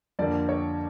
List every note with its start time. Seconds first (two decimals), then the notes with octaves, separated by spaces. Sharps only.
0.19 F2 D3 G3 A#3 D5
0.49 C#5